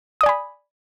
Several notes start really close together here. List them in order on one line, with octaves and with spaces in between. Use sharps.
D#6 D5 G#5 B5